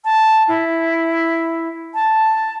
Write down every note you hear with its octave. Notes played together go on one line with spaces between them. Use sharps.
A5
E4
A5